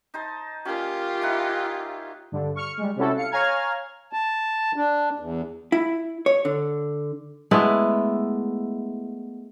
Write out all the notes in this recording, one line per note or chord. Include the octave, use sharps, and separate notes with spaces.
D#4 C5 A5
A#2 C#4 F4 G4
D#4 E4 F#5
G2 D3 D4
C#6 F6 C#7
G3 G#3
C3 G3 C#4 E4 F#4 A4
F5 C#7
C#5 F5 G#5 A#5 F6 G#6
A5
D4
E2
E4
C#5
D3
G#3 A3 B3 E4